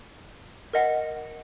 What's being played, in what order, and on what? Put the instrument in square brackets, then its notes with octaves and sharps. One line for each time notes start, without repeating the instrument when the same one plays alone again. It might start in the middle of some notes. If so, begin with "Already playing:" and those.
[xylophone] A#4 D#5 F#5